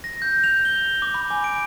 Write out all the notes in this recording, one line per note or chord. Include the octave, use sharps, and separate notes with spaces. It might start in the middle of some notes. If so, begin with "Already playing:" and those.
A#6
G6
F7
G7
D6
B5
G#5
D7